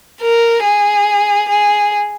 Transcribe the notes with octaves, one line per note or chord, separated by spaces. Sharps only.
A#4
G#4
G#4